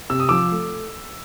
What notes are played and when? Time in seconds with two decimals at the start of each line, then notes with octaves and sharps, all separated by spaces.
0.10 C3 E6
0.20 D#6
0.29 F3 D6 E6
0.51 A3